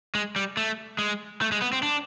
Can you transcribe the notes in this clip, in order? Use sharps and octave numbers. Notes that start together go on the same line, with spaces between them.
G#3
G3
A3
G#3
A3
G#3
B3
C4
D4